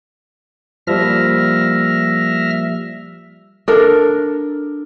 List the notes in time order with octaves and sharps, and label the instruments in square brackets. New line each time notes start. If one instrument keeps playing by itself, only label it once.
[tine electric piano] F3 G3 A#3 [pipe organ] E5 F6 A#6
[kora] D4 A4 A#4